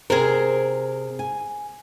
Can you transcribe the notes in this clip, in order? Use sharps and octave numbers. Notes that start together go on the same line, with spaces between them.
C3 G#4 A#4 C5
G#5